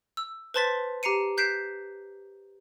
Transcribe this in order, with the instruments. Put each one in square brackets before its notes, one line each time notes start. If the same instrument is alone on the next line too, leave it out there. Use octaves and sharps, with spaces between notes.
[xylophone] E6
B4 C5 A5 C6 A6 B6
G4 A#5 C7 C#7 D#7
F#6 G6 B6 C7 D7 E7